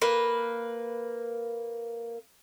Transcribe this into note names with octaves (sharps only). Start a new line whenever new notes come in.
A#3 B4